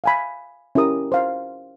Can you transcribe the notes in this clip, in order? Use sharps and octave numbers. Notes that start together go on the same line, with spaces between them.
F5 G#5 B5
C#4 E4 G4 A#4 D#6
C5 F5